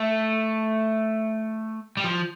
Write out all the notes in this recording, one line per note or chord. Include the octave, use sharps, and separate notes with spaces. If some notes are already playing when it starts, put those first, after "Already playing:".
Already playing: A3
G3
F3